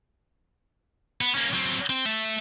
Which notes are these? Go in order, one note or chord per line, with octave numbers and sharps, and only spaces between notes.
B3
A#3 C#4
F#3 C4
C4
A3 E5